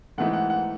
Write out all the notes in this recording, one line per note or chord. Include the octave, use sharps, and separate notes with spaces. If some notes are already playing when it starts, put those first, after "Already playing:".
G#2 E3 A3 D#4 F#5
F#5
F#5